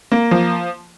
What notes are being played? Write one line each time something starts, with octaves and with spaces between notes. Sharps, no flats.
A#3
F3